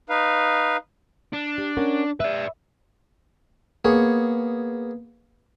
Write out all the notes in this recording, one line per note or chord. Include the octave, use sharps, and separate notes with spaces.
D#4 B4 F5
D4
G4
C#4 A#4 F#5
B4 D5 E5
A#3 B3 G#4 C#5